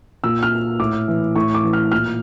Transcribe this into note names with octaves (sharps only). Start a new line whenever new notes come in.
A#2 E6
F6
A2 D6
E3
A2 C#6
D6
E3
F6
A#2 F6